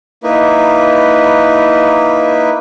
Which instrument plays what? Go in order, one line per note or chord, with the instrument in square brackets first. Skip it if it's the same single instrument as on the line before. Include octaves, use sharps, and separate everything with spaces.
[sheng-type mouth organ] A#3 D#4 E4 B4